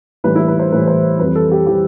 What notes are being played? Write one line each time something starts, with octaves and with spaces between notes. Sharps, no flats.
A2 E3 G3 B4
E4
B4
C5
A2 E3 G3 B4
C5
F2 E3 G3 B4
A4
G4
E3 G3 G4